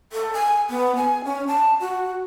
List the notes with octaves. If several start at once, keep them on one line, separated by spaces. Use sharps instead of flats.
A4
G#5
B3
G#5
C#4
A5
F#4